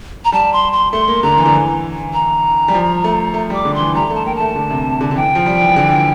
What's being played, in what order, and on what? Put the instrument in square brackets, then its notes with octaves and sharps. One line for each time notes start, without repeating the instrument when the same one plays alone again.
[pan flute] A#5
[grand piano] G3 [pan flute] A5
[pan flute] C6
C6
[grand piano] A3 [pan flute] C6
[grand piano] A#3
[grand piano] D3 [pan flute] A#5
[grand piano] E3
D3
E3
[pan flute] A#5
[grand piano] G3
F3
A3
A3
G3
[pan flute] D6
[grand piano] D3
[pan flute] C6
[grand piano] E3
[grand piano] G3 [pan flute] A#5
[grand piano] A3
[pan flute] A5
[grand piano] A#3 [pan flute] G5
[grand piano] A3 [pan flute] A5
[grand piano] D3
C3
D3
D3
[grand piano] E3 [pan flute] G5
[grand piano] F3
G3
E3
D3
E3